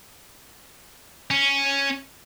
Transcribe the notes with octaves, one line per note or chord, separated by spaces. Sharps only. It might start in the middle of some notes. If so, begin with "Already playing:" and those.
C#4